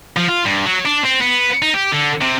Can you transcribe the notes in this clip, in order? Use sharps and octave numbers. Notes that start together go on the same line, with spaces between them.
F3
F4
G2
F#3
D4
C4
B3
D#4
G4
D3
C3